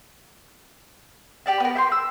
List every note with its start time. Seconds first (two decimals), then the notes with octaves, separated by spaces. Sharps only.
1.46 G4 D5 A5
1.60 B3 A#4
1.75 E5 G5 C6
1.92 E6